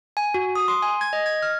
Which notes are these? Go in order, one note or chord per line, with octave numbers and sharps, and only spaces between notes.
G#5
F#4
D#6
C6
G#5
G#6
D#5
G#6
F6